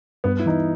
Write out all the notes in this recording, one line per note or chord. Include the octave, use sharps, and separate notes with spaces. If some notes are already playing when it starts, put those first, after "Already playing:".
G2 B3
E4
E3 D#4